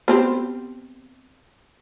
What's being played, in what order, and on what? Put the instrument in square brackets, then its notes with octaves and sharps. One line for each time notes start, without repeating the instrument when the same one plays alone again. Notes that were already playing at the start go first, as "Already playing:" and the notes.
[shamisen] B3 C4 G4